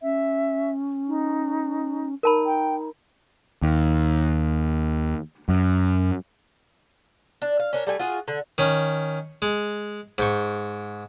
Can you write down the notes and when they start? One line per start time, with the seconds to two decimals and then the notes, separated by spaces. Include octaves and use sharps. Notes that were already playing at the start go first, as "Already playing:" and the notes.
0.01 C#4 E5
1.08 D#4
2.23 D#4 A#4 A5 B5
2.46 G5
3.62 D#2
5.49 F#2
7.42 D4
7.60 F5
7.73 C#4 D4 A#4
7.87 G3 A3 G5 G#5
7.99 F4 F#4 G#4
8.28 D3
8.58 D#3 C#4
9.42 G#3
10.18 G#2 G5 C#6